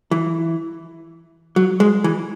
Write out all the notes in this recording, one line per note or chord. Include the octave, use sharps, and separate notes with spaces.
E3
F#3
G#3
E3